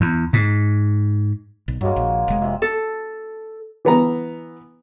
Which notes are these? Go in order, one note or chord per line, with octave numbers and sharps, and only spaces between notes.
E2
G#2
B1
G2 F#3 G#3 A#3
A#1
F1 G#3
C3 F3
A4
E3 B3 A#5